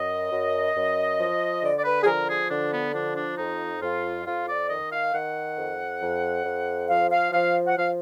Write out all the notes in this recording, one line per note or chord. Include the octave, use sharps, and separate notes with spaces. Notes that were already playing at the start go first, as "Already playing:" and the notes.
Already playing: F#2 D#5
F#2
F#2
F3
D3 D5
D5
B4
G#4
F3 A#4
G#4
D3 D4
B3
F3 D4
D4
F2 D#4
F2 F4
F2 F4
D5
D#3 D#5
F5
D#3 F#5
F2
F2
F2
F3 F5
F5
F3 F5
F#5
F3 F5